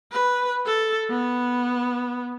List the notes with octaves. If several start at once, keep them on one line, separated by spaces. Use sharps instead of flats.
B4
A4
B3